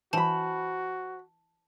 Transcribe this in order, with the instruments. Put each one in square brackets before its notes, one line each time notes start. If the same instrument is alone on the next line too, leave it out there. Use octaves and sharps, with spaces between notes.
[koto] E3 [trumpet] F#4 [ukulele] C5 B5 [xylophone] A5